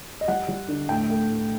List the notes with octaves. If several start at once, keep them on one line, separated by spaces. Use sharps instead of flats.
D#5
G3 F#5
G3
D3
A2 G5
A3
A2